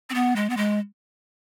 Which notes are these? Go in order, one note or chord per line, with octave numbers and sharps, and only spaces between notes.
C4
B3
G#3
B3
G#3